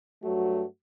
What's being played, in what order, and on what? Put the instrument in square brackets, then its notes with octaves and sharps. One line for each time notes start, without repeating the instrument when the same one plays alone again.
[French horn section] G2 F#3 A3 F#4